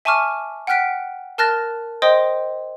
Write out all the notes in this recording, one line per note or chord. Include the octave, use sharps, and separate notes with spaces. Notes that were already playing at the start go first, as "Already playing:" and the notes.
E5 G#5 A5 C#6 D6 F6
F#5 G5 F6 F#6 B6 D7
A#4 A5 F6 F#6 A6 A#6
C5 D#5 G5 C6 D#6